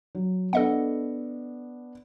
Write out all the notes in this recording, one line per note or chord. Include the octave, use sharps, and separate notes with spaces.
F#3
B3 D4 A4 D#5 F#5